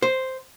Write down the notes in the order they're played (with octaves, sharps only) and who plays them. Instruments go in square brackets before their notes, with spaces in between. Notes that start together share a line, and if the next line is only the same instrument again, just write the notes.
[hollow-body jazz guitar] C5